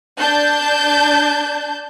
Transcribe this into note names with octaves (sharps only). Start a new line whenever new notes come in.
D4 A5 G6